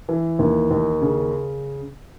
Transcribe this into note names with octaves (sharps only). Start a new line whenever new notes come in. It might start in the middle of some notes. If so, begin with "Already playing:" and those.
E3
D#2
D#2
C#3